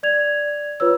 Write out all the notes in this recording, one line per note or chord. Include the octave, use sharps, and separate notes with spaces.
D5 G#6 F7
F4 B4 C#5 E6